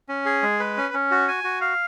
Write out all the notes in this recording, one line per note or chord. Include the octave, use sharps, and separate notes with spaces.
C#4
G#4
G#3
B4
C#4
C#4
F#4
G#5
F#4
F5